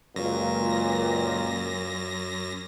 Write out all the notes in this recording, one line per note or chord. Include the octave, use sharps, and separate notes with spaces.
C#2 F#2 A#2 A#6